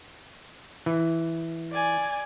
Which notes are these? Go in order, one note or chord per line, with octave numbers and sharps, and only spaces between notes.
E3
D5 G#5